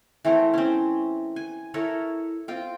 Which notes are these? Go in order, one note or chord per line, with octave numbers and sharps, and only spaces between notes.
E3 A3 C4 A#4
C4 C#4
G#5
E4 A4 A#4 C#5
C4 F4 G5